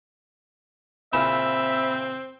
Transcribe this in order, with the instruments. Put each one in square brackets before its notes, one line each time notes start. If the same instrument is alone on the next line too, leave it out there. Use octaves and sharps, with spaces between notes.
[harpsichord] A#2 C#3 E4 [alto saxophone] C4 [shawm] E5 [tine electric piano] B5